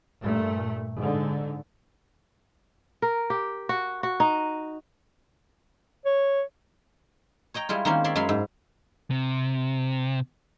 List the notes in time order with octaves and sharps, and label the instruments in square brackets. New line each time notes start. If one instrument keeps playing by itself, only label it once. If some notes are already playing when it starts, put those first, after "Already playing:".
[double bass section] G2 A#2 A3
G#2 D3
[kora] A#4
G4
F#4
F#4
D#4
[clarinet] C#5
[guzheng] C#5 D#5 G5 A#5
G3 G#3 E4 F4
D#3 G#3 A#3 C4 C#4
C#5 D5 E5 C6
F#2 G#3 E5 F5 B5 C6
G#2
[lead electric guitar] C3